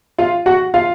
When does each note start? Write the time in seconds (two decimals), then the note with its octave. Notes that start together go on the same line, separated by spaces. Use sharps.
0.18 F4 F5
0.46 F#4 F#5
0.74 F4 F5